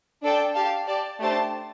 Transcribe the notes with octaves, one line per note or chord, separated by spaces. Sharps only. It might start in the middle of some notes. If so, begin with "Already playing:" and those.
D4 A4 D5 G5
G4 F5 A5
G4 D5 A5
A3 D4 G4 C5 A5